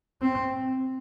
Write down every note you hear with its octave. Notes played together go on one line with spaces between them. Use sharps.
C4